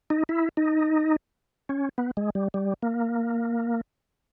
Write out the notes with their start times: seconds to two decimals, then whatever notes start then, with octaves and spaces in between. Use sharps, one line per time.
0.10 D#4
0.29 E4
0.57 D#4
1.69 C#4
1.98 B3
2.17 G#3
2.35 G3
2.54 G3
2.83 A#3